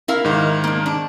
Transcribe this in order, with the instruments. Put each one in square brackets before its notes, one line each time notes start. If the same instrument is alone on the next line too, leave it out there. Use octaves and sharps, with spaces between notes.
[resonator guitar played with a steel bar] E4 A#4 F5
[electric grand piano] G#2 D#3
[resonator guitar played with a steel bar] A#3 D4
D4